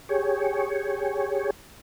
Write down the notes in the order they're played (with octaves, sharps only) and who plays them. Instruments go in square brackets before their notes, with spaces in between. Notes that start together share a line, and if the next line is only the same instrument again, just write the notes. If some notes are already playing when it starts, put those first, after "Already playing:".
[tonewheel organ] G4 G#4 C#5